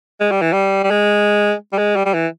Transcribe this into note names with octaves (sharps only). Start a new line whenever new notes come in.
G#3
G3
E3
G3
G3
G#3
G3
G#3
G3
G3
E3